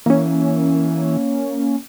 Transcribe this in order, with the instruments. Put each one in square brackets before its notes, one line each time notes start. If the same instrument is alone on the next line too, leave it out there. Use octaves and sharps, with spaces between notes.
[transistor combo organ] E3 [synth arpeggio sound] A#3 C#4